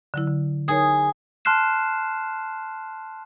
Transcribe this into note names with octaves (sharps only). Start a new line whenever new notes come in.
D3 F#3 E4
D3
D#4 G#4 A#4 C#5
A5 C6 F6 F#6 C7 E7